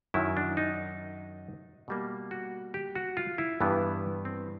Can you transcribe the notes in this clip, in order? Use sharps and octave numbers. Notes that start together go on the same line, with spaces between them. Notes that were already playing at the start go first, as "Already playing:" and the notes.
F#2 D#3 F#3 E4
D4
D#4
B2 G3 A#3
F#4
G4
F#4
F4
E4
G2 E3 G3 B3
C4